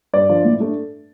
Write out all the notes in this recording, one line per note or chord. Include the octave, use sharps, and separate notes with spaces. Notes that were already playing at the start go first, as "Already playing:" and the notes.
G2 D5
F3 D4 F4
A2
A3 D4